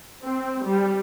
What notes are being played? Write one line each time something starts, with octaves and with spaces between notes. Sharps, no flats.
C4
G3